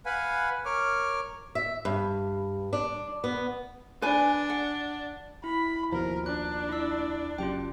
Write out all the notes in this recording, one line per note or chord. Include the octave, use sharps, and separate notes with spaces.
B4 F5 F#5 G#5 B5
A#4 C#5 C#6 D6 F6
E5
G2
D4
B3
D4 B4 G#5
F#5
E4 B5
D#2 B2 F3 A#4
D4 F#6
E4 E6
F#1 F#2 F4 G4 G5